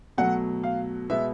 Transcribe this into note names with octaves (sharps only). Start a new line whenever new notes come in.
B2 F#3 A3 F#5
F5
B2 G#3 B3 E5